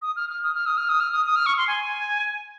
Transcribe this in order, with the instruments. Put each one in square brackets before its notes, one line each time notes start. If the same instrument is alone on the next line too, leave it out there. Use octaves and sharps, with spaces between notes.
[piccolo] D#6
F6
F6
D#6
F6
D#6
F6
D#6
F6
D#6
D#6
F6
C#6
C6
G#5